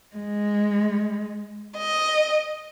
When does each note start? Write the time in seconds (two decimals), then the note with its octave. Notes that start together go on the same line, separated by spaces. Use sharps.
0.16 G#3
1.78 D#5